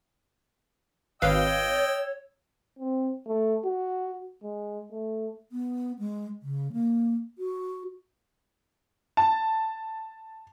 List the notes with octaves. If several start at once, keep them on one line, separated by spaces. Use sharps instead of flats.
G#1 B4 C#5 D#5 F5 G5 E6
C4
A3
F#4
G#3
A3
B3
G#3
C#3
A#3
F#4
A5